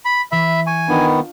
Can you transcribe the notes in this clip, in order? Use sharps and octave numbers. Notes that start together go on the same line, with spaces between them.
B5
E3 E5 B5
G#5 C#6
D#3 B3 D4 F4